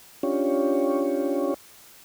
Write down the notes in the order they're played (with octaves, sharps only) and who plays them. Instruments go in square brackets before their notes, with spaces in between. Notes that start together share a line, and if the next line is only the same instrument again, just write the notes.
[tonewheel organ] C#4 D4 F4 G4 C#5